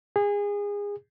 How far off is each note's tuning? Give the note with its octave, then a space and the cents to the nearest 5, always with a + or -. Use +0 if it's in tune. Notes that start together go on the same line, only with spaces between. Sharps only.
G#4 -25